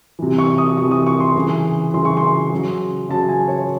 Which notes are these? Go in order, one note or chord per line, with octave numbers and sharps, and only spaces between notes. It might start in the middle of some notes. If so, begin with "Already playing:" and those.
C3 E3
C#6
D#6
C3 E3 C#6
D#6
C#6
C6
C#3 E3
C#3 E3 C6
C#6
C6
C#3 F#3
C#3 F#3 A5
G#5
C#5